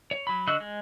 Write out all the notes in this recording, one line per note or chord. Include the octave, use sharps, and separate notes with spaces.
C#5
F#3 B5
D3 F#4 D#5 E6 F#6
G#3